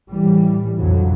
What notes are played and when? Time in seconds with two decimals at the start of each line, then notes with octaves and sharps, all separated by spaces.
0.11 A2 E3 G3
0.77 C2 F2 B2 D3 F3 F#3